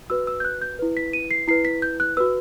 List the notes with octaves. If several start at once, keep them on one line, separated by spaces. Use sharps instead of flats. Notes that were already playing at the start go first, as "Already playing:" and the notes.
F#4 B4 E6
E6
G6
F#6
G6
E4 B4
B6
D#7
C7
E4 B4 C7
B6
G6
F#6
F#4 B4 E6